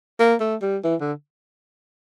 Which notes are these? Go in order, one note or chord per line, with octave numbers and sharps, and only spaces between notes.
A#3
A3
G3
E3
D3